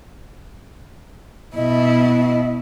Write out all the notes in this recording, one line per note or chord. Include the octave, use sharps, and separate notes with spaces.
B2 E4 D#5